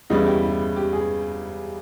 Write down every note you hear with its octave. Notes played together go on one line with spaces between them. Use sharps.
E2 C#3 G3 D#5
E4
G4
E4
G4
G#4